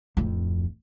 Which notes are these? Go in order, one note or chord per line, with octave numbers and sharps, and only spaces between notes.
D1 F2